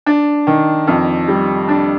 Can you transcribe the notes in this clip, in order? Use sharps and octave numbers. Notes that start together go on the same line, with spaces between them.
D4
D#3
F2
G3
D4